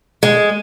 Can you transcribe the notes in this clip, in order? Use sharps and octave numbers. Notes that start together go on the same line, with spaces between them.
G#3